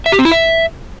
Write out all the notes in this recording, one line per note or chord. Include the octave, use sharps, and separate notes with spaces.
E5
G4
C4
E4
E5